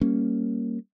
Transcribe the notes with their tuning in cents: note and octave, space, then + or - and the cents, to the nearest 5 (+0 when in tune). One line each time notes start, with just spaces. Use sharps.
G3 +0 A#3 +0 C#4 +0